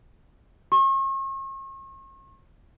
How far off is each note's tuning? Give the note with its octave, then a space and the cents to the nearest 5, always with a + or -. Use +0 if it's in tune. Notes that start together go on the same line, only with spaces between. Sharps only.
C#6 -40